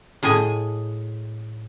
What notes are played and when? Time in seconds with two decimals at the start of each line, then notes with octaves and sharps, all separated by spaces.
0.23 A2 G#4 D#5 G#5